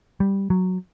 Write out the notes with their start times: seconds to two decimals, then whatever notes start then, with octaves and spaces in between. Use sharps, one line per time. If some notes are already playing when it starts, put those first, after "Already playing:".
0.20 G3
0.50 F#3